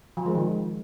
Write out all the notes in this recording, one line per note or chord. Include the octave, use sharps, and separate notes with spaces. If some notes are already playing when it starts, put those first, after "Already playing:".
F3
G#3
D#3